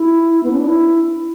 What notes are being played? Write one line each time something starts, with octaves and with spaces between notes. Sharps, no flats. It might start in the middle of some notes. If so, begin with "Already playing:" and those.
Already playing: E4
B3
C#4
D4
E4